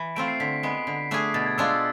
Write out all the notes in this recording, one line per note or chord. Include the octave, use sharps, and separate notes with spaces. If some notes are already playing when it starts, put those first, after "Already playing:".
Already playing: E3
A3 C4 F4 D7
C7
D3 B6
G#3 B3
D3
A3 D4 G#4
B2 A6
G#6
G#3 D4 F4 E6
E6